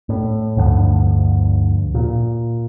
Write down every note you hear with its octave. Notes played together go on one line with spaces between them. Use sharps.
A2
D2 G2 D3 F3
A#2